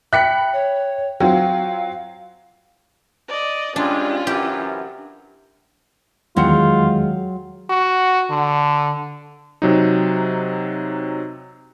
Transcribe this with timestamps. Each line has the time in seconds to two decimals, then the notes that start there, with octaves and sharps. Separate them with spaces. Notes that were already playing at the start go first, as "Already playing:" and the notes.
0.13 E5 G5 B5 F#6 B6 C#7
0.53 C#5
1.20 F#3 C4 F4 F5 G5
3.28 D5 D#5
3.76 G2 G3 G#3 C#4 D4 F4
4.27 F#2 C3 E3 G4
6.36 E2 D#3 F#3 G#3 F4 F#5 G5
7.70 F#4
8.31 D3
9.62 C3 F#3 D#4